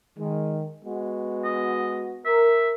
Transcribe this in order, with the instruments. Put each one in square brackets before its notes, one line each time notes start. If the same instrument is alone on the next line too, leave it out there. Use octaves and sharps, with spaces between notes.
[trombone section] D#3 G#3
G#3 B3 F#4
[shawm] D#5
[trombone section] A#4 [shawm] E5